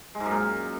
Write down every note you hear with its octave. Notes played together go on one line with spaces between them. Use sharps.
G#3
G#2
F#2
A#2